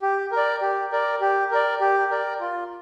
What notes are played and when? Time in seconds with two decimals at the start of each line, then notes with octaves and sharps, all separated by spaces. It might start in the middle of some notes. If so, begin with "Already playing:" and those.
0.02 G4
0.32 A#4
0.37 D5
0.61 G4
0.92 A#4 D5
1.21 G4
1.51 A#4 D5
1.80 G4
2.10 A#4 D5
2.40 F4